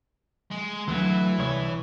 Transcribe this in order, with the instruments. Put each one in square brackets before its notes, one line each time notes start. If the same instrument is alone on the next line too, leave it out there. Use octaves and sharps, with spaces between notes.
[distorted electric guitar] G#3
[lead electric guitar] D2 F#3 [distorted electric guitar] E3
[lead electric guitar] C2 C#5